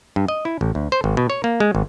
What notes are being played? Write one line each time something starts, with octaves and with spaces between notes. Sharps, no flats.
G2
D#5
E4
A1
D2
C5
G#1
B2
C#5
A#3
G#3
G#1